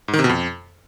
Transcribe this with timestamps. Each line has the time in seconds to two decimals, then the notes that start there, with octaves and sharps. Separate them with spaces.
0.08 G#2
0.13 D#3
0.19 C3
0.24 B2
0.29 F2